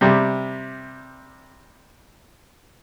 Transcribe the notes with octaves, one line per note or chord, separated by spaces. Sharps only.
C3 G3